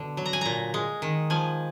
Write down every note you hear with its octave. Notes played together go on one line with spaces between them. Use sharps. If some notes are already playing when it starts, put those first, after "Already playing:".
Already playing: B2 D3
F#3
A#5
G#5
A#2 A#5
G#3
D#3
F3 G#5